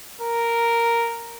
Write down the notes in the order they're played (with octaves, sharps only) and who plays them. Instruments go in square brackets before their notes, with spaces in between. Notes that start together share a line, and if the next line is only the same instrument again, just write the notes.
[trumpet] A#4